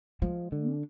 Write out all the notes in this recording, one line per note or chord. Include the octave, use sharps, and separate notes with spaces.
F3 G#3
D3
D4